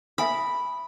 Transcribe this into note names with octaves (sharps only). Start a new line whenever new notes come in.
E5 G#5 B5 D#6